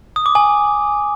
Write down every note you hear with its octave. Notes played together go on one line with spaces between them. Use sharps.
D#6
D6
G#5